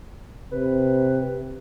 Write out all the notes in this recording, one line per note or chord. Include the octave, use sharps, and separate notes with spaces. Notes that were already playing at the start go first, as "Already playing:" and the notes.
C3 B4